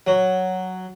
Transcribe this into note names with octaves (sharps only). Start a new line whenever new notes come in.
F#3